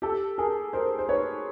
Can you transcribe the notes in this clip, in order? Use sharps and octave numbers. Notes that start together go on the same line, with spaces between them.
G4 A4
G#4 A#4
A#4 C5
C5
B4 C#5